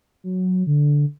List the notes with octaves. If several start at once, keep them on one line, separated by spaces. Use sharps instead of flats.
F#3
D3